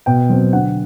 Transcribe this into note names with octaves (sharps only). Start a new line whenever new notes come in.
B2 G5
F#3 C4
D3 F#5